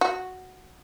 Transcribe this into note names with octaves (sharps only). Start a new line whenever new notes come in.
F#4